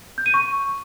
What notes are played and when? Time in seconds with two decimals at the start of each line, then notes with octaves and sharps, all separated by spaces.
0.18 G6
0.26 D#7
0.34 C#6